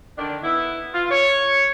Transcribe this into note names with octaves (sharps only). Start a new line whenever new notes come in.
D3 D#3 D4
B3 E4
F4
C#5